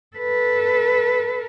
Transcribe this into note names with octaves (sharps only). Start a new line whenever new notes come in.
A4 B4